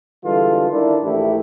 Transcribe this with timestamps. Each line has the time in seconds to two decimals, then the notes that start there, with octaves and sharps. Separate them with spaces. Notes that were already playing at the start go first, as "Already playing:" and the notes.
0.25 D3 E3 G3 G#3 F4 A4
0.71 D#3 D4 E4
1.03 A#1 E3 A3 E4 G4